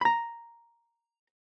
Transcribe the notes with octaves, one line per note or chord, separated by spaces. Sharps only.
A#5 B5